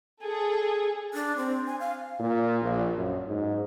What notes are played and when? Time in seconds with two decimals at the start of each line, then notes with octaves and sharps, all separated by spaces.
0.23 G#4 A4
1.14 D4
1.37 C4
1.67 G#5
1.80 F5
2.19 A#2
2.62 A#1
2.97 F#2
3.27 G#2